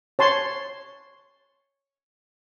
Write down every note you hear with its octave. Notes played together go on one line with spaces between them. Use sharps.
C#5 A5 C6